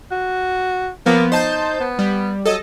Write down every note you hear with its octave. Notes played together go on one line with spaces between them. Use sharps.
F#4
F3 A#3 B3
D#4 C5 A5 G6
B3
G3
F#3 A4 D#5